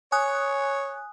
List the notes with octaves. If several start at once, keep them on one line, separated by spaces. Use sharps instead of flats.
C#5 G#5 D#6 F#6